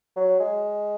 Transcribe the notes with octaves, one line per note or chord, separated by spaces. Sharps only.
F#3
G#3